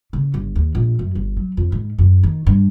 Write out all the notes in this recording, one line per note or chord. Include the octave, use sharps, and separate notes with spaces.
C#3
G1
D#2
A#1
F#2
G1
F#3
F2
G#2
F#2
D#3
G2